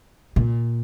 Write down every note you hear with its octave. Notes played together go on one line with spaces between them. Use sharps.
A#2